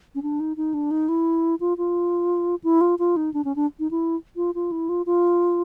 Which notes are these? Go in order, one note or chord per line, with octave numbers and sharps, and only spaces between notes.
C#4
D4
D#4
D#4
D4
D#4
E4
F4
F4
E4
F4
F4
D#4
D4
C#4
D4
D#4
E4
F4
F4
E4
F4
F4